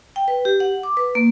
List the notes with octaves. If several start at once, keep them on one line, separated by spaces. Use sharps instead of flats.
G5
B4
G4
F#5
D6
B4
A#3